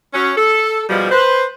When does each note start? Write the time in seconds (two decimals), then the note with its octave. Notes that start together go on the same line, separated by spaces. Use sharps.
0.14 F#3 C#4
0.37 A4
0.89 G#2 B2 F3 G3
1.11 B4 C5